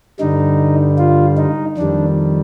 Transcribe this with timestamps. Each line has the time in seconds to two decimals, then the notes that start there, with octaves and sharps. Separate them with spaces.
0.19 G2 D3 G3 D#4
0.98 F4
1.38 D#4
1.77 F2 D#3 G3 D4